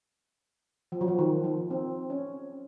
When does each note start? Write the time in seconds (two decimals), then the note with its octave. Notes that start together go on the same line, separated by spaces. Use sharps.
0.92 F3
1.01 F#3
1.08 F3
1.19 D#3
1.44 F3
1.70 C4
2.10 C#4